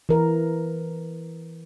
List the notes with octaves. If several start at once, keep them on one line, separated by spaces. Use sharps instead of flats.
E3 A#4